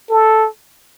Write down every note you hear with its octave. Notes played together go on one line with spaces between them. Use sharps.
A4